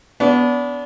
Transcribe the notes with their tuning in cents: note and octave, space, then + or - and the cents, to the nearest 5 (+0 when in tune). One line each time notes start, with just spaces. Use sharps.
B3 +0 D4 -30